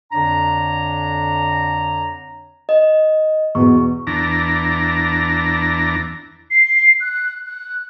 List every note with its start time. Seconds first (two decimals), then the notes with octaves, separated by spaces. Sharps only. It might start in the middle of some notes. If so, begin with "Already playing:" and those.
0.12 F2 D3 D4 C#5 A#5
2.69 D#5
3.55 E2 B2 C#6
4.07 E2 D4 A#5
6.51 C7
7.01 F#6
7.46 F#6